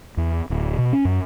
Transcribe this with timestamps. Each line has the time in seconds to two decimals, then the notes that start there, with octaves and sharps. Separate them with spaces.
0.17 E2
0.50 D1
0.78 B2
0.93 C#4
1.05 F#2